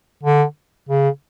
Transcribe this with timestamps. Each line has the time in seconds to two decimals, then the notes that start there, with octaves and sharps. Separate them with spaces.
0.23 D3
0.89 C#3